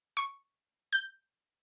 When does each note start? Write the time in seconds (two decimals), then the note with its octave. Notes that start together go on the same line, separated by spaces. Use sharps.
0.17 C#6
0.93 G6